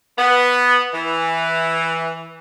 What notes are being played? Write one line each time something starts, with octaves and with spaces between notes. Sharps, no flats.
B3
E3